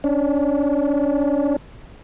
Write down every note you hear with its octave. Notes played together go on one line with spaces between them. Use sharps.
C#4 D4